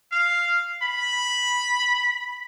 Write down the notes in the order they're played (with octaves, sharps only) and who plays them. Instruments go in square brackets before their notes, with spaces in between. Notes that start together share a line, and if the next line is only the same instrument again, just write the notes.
[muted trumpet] F5
B5